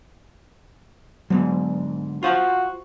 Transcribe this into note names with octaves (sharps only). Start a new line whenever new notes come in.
D2 G#2 F#3 B3
F4 F#4 C5 F5